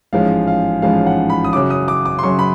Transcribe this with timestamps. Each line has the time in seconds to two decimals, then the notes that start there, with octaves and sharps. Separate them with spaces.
0.13 A1 G#2 F3 G#3 C#4 F5
0.47 F5
0.82 A1 G#2 F3 G#3 C#4 F5
1.06 F#5
1.30 B5
1.44 D#6
1.53 F#2 C#3 F#3 D6
1.70 D#6
1.88 D6
2.05 D6
2.19 C6
2.23 F#2 C#3 F#3 C#6
2.39 B5